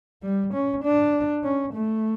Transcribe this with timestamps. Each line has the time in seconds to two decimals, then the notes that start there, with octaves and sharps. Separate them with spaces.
0.23 G3
0.53 C#4
0.84 D4
1.44 C#4
1.74 A3